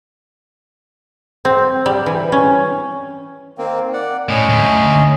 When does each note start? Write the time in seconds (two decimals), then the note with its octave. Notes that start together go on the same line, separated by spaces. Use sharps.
1.45 C4
1.86 G3
2.06 E3
2.32 C#4
3.58 D#3 A#3 C4
3.93 D5 F#5
4.29 A2 C#4 D#5
4.50 D2